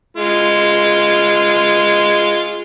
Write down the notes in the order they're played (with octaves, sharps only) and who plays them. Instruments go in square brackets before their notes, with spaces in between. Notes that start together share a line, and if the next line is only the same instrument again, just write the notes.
[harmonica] G#3 F4